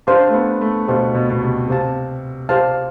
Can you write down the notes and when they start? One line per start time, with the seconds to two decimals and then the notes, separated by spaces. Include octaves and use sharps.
0.07 D4 G4 C5 F5 A5
0.29 A3
0.34 B3
0.61 A3
0.88 B2 G4 C5 F5 A5
1.14 B2
1.30 B2
1.42 C3
1.68 C3 G4 C5 F5 A5
2.49 G4 C5 F5 A5